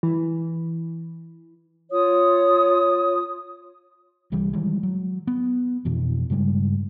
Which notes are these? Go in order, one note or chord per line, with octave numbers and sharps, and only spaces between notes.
E3
F4 C#5 D#6
C2 E3 G3
D#3 E3 G3 G#3
F#3
B3
F2 B2 E3
G2 C#3 G3 G#3